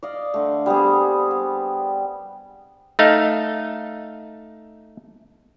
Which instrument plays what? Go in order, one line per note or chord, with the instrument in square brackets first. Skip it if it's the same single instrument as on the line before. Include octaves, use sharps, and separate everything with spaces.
[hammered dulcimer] D5 D#5 F5
D3 A3
G3 B3 C4 G#4
B3
[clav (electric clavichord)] A3 D#4 F5